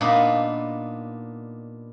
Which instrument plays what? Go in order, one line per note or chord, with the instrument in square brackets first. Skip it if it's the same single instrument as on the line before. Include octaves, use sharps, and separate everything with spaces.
[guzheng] A#2 B3 D4 D#4